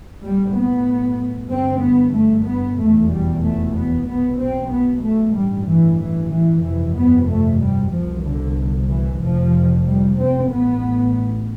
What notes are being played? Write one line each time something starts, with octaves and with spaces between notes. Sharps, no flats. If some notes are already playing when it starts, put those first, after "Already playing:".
B1 A2 G3
B3
G1 G2 C4
B3
A3
B3
F1 E2 B2 A3
G3
A3
B3
B1 B2 B3
C4
B3
A3
A1 G3
G2
E3
E3
E3
G1 F2 C3 E3
B3
A3
G3
C2 B2 F3
D3
E3
F1 F2 C3 F3
G3
C4
A1 A2 B3